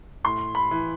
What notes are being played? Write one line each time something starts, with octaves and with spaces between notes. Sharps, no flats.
A2 C6
B5
E3